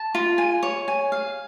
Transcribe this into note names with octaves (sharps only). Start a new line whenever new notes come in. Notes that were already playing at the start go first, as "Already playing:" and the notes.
Already playing: A5
F4
G#5
C#5
G#5
F5